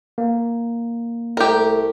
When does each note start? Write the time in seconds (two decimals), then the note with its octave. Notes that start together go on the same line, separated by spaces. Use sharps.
0.18 A#3
1.37 C2 A3 G4 A#4